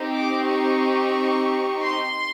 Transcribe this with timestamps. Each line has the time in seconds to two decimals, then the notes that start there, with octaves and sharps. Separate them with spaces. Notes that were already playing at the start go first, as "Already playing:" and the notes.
Already playing: C4 D#4 G4
0.14 D6
0.47 C#6
1.84 C6